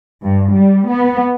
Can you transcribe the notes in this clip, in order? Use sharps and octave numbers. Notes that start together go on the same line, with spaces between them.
G2
G3
B3